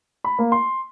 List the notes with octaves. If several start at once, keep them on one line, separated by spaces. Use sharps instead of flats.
B5
A#3
C6